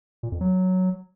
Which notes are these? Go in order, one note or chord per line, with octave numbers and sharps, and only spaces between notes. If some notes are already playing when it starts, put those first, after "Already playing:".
A#2
F2
F#3